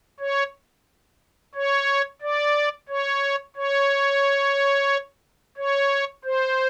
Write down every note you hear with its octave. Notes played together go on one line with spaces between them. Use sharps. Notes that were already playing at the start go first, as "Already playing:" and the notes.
C#5
C#5
D5
C#5
C#5
C#5
C5